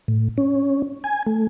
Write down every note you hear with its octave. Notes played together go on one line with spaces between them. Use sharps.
A2
C#4
G#5
A3